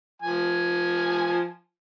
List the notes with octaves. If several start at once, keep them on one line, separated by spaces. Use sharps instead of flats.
F3 G#5